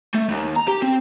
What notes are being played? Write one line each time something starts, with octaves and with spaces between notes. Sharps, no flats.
A3
D#2
A#5
G4
C4